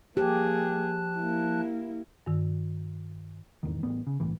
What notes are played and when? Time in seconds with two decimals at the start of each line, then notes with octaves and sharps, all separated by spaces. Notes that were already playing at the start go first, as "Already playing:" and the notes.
0.17 F3 A#3 G4 G#4 A5 F#6
1.18 A#3 E4
2.26 G2 D#3
3.63 D#1 E2 G#2 D#3
3.83 A1 B3
4.07 C#3
4.20 G1 C2 A2 E3